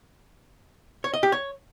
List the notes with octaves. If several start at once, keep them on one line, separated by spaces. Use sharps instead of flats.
C#5
D#5
G4
C#5